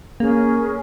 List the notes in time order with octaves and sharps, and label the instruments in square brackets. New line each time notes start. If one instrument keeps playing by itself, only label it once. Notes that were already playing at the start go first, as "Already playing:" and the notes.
[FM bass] A#3 [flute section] C#4 G#4 A#4